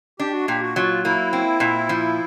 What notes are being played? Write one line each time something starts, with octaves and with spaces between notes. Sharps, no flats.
D4 G4
F#4
A#2 G4
F#4
F#3 F4
A#3 E4
C4
A#2
F3